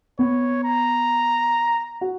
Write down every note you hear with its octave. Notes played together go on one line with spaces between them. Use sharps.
B3 C#5
A#5
F#4